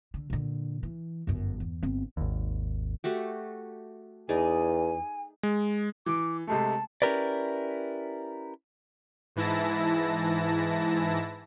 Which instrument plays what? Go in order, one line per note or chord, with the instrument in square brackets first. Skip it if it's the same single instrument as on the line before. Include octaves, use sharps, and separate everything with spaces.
[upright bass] D3
A#2 D3
E3
G1 F#2
E2
G1 C4
[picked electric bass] G#1 D#2
[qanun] A3 F#4 G4
[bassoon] E2 [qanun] D#4 G#4 D5 [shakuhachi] G#5
[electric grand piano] G#3
[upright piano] E3 [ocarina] D6
[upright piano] C3 G#3 A3 [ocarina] A5
[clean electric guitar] C#4 E4 G4 A#4 B4 D5
[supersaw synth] G#2 E3 E4 A5 A#6